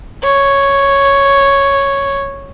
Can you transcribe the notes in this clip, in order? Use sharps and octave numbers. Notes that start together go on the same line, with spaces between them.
C#5